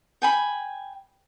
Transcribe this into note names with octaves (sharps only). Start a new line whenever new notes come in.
G5 G#5 B5